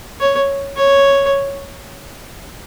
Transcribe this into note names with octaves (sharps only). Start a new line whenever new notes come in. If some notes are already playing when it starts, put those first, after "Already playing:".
C#5
C#5